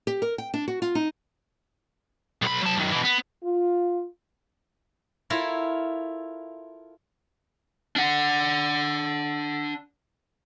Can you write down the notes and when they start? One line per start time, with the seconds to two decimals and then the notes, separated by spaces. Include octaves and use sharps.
0.07 G4
0.22 A#4
0.38 G5
0.54 D4
0.68 F#4
0.82 F4
0.95 D#4
2.43 B1 B5
2.63 F#3 A5
2.78 F#2 D#3
2.92 B2 E3
3.04 B3
3.44 F4
5.30 E4 F4 A4 A#4 C#5
7.96 D4 F#5